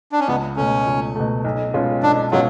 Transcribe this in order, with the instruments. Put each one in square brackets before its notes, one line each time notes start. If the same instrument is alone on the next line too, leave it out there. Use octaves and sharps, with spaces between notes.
[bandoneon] D4
C#4
[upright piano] C#2 [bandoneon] B3
[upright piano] B2 A3 [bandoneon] C#4
[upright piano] C#2
B2 A3
B1
B2 G#3 C#4 F4
[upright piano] B1 [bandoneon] D4
[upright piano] B2 G#3 C#4 F4 [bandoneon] F#3